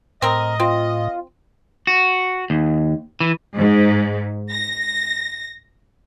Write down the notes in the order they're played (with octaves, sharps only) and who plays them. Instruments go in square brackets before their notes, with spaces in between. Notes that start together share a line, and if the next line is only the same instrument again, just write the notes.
[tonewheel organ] A2 [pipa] C4 A#4 [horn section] D#5
[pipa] C4 [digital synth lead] F4
[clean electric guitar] F#4
D#2
E3
[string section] G#2
A#6